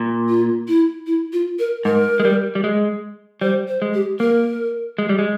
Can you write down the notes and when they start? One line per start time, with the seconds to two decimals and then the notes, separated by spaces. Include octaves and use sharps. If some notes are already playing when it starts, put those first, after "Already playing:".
Already playing: A#2
0.29 F4
0.68 E4
1.07 E4
1.33 F4
1.59 A#4
1.85 G#2 A#4
2.20 G#3
2.25 G3
2.55 G3
2.64 G#3
3.41 G3 C5
3.68 C5
3.82 G#3
3.94 G4
4.20 A#3 A#4
4.99 G#3
5.09 G3
5.19 G#3